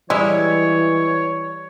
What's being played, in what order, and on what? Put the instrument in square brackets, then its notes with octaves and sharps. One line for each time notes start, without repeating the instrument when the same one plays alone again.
[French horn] E3 [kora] G3 E4 [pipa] G#3 [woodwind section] C#5